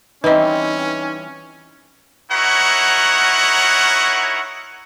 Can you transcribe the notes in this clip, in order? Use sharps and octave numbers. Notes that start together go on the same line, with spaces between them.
E3 G3 C4 C#4 D#4 B4 D#5
D#4 E4 F#4 A#4 C#5 F#5